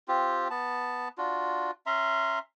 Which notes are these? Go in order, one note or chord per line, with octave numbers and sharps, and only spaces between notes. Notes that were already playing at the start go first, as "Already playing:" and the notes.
C4 F4 G4
B3 A5
D4 F4 F#4
C#4 E5 A#5 C6